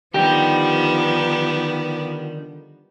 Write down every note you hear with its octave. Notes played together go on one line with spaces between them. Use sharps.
D3 D#3 F3 G3 B3 D#4 G4